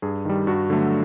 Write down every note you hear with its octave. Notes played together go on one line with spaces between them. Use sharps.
G2 G#4
D#3 G3
G2 F#4
D3 F#3 A3